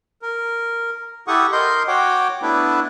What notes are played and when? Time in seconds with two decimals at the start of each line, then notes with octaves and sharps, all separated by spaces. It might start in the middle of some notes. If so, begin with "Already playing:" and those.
0.22 A#4
1.28 E4 G4 A4 F#5 C#6 D#6
1.52 A#4 D#5 C6 G6
1.88 F#4 C#5 F#5 G5 D6
2.42 A3 B3 D4 E4 B4